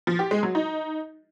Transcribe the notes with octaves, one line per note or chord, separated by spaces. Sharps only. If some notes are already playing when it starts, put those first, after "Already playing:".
F3
G4
G#3
F#3
D#4